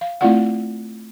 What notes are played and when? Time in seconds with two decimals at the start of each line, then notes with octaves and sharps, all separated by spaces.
0.01 F5
0.21 A3 C4 E4 F4 D5 F#5